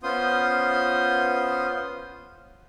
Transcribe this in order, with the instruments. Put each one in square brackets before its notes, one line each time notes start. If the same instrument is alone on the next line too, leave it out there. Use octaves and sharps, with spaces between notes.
[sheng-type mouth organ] B3 C#4 F4 C5 C6 D#6